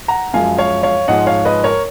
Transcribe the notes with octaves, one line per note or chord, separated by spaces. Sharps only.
F#5 A#5
F#2 F3 G#3 F5 G#5
C#5 F5
C#5 F5
G#2 F3 G#3 D#5 F#5
C#5 F5
B4 D#5
A#4 C#5